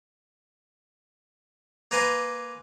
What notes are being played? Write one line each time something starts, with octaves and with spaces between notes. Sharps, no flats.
A#3 A#4 B4 G#5 C6 D6